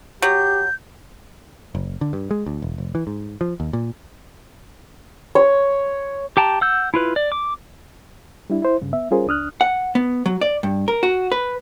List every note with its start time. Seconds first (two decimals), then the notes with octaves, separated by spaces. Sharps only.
0.22 F#3 G4 G6
1.75 F#1
2.01 D3
2.13 G2
2.31 G#3
2.46 D2
2.62 E1
2.78 F1
2.95 E3
3.07 G#2
3.41 F3
3.60 D#2
3.73 A#2
5.35 C#5
6.37 G4 G5 A5 A#5
6.61 F#5 E6 G6
6.94 E4 F4 B4
7.16 D5
7.32 D6
8.50 G3 D4 E4
8.62 E4 C5
8.82 G2 C#3
8.93 B3 E5
9.11 G3 C#4 F4 G#4 A#4 C5
9.27 C#2 D4 D#6 F6 F#6
9.61 F#5
9.95 B3
10.26 F#3
10.41 D5
10.63 G2
10.88 A#4
11.03 F#4
11.32 B4